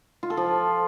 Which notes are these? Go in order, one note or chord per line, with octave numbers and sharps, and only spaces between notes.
F4
A4
F3